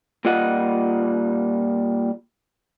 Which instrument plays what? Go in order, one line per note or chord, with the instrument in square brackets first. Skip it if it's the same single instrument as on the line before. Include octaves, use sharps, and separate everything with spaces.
[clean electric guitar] A#2 G3 F4 D#5 F#5